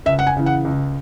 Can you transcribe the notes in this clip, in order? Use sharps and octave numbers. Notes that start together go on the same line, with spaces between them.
C#2 E5
F#5
G#5
C#3 E3
F#5
C#2